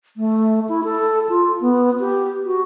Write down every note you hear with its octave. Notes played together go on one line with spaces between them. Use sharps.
A3
E4
A4
F4
B3
G4
F#4